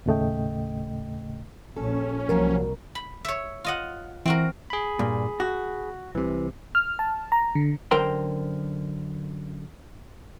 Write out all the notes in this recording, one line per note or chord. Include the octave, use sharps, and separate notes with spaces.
D#2 A2 C#3 A3 D#5 G5
A#1 C#4 A4
C2 F3 F#3 A#3 A#4
B5
C#5 E5
F4 D#5 F#5
E3 C4 F#4 A#4
G#4 B5
G2 A#2
F#4
C2 C3 E3
F6
A5
A#5
D3
F#2 D3 A#4 C5 G5 C6